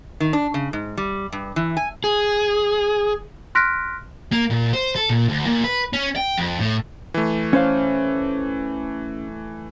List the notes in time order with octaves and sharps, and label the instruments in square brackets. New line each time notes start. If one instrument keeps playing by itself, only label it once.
[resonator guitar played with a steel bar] D#3
D4
C#3
G#2
G3
G2
E3
G#5
[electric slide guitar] G#4
[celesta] C6 F6 F#6 A#6 B6 D7
[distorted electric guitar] A#3
A#2
C5
A4
A#2
D2
A#2
B4
C#4
G5
F2
A2
[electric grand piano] E3 A3
[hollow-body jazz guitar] C#4 C5 F5